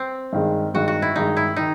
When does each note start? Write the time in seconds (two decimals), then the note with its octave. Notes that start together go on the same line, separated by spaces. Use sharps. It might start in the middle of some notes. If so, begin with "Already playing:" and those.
Already playing: C4
0.33 G2 D#3 G#3
0.74 G2 D#3 G#3 F#4
0.88 F#4
1.02 E4
1.16 G2 D#3 G#3 D#4
1.37 E4
1.56 D#3 D#4